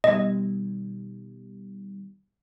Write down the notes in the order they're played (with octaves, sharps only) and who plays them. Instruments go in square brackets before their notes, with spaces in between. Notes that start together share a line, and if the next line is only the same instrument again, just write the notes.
[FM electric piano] B2 D#3 G3 [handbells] D#5